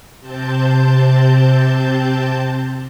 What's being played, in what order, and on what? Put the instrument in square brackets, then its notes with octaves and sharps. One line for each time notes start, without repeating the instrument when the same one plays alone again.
[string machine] C3 C4 A5 G6